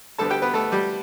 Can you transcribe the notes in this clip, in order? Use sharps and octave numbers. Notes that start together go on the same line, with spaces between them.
D2 D3 G3 B3 A4 A5
G4 G5
B3 B4
A3 A4
G3 G4